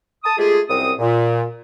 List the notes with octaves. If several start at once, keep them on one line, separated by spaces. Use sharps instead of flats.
A5 D#6
G#3 A3 F4 G4 G#4
C2 F#2 C4 D#6
A#2